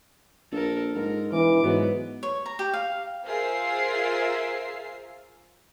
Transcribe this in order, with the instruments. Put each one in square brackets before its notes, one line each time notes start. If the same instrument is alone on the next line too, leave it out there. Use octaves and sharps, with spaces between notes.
[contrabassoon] A#1 [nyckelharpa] A4 A#4
[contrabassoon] G#2 [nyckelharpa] A#4
[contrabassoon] E1 [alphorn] E3 [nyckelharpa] D6
[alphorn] G#2 [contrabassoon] F#3 [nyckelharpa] B3
[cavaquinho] C#5
A#5
G4
F5
[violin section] F4 G#4 A#4 C5 E5 C7